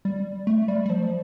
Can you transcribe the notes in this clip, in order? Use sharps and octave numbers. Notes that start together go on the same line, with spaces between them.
G3
A3
G3
G3
F3